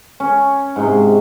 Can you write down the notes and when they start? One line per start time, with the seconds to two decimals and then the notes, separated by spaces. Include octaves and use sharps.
0.20 C#4
0.76 G#2 C3